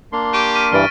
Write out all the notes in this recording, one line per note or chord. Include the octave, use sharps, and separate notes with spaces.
A#3 D4 C6
G4 C#6 D7
F6 B6 D#7
G2 E3 G3 F6 A6 D7